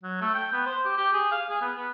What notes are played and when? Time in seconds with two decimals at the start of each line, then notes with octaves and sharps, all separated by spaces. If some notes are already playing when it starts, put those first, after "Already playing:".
0.03 F#3
0.21 A3
0.34 G5
0.53 B3
0.66 C5
0.85 G4
0.98 G4
1.13 G#4
1.32 F5
1.50 G#4
1.61 B3
1.76 B3